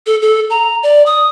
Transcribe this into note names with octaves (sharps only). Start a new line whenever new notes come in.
A4
A4
A#5
D5
D#6